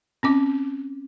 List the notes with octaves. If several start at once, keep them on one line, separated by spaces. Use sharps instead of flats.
C4 C#4 D6